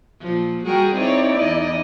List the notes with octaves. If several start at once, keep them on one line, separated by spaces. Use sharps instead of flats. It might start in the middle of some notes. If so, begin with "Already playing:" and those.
A#2 F3
G3 F#4 G#4 A#4 G5
C4 D#4 E4 C#5 D5
E2 D#5